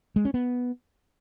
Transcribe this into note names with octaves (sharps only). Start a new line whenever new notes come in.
G#3
C#4
B3